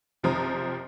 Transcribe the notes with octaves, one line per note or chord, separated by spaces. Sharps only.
F#1 C3 F3 C4 A#5 D#6